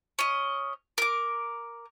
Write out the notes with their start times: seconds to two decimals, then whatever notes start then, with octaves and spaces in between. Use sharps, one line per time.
0.19 C#4 D#5
0.98 A#4 D6